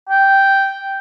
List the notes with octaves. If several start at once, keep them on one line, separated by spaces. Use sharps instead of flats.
G5